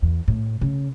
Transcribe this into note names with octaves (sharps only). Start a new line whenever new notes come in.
E2
A2
C#3